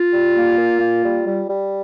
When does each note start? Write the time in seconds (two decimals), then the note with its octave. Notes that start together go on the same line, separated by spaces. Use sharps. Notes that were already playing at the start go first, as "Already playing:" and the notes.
Already playing: F4
0.12 G3
0.35 A#3
0.57 A#2
0.80 A#3
1.03 G3
1.25 G3
1.48 G3